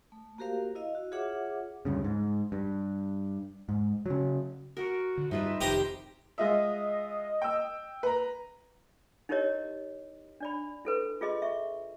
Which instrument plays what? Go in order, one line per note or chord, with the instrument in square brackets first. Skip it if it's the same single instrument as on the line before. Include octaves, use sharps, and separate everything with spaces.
[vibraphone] A3
A#3 F#4 G4 A#4 C5 F5
E4 D#5 F5
F#4
F4 G#4 C#5 E5 F#5 D6
[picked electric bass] D2 G2 C#3
G#2
G2
G#2
C#3 F#3
[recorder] F#4 [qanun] A#4
[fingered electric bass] D3
[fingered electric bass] G2 G3 [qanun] D#4 F4 B4 [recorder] E5
[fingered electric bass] F1 [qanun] D#3 C5 D#5 [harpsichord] G4 A#5 D6
[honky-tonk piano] G#3 F4 E5 [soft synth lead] D#5
[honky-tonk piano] G5 E6
B4 A#5
[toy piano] D#4 E4 G4 A#4 C#5 D#5
D4 D5 B5
E4 A4 B4
F4 G#4 D#5 C6
E5 C#6